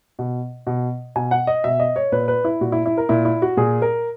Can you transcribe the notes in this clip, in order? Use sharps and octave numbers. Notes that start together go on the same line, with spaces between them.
B2
B2
B2 G#5
F#5
D#5
B2 E5
D#5
C#5
A#2 B4
B4
E4
A#2 F#4
E4
E4
A#4
A#2 E4
E4
F#4
A#2 G#4
A#4